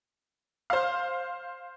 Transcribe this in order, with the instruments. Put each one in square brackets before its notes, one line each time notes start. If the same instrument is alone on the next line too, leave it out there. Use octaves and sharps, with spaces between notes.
[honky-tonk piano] C5 F5